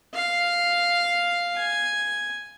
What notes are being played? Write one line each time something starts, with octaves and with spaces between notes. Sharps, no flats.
F5
G#5